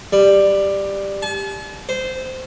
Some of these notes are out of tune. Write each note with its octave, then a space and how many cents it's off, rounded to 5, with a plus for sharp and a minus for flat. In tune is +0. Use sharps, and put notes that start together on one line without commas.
G3 +10
A5 -45
C5 -15